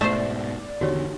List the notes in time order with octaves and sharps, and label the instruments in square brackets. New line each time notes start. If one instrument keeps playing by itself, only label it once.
[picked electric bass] G#2 B2 [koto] A3 A4 C5 [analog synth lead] D5
[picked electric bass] E2 D3 D#3 [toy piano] F#4 G4 C#5